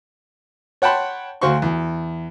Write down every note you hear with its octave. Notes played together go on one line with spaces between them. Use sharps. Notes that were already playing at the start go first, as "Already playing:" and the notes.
C#5 F#5 G5 A5 B5 C6
D2 F#4 C5 F5 C6 C#6
E2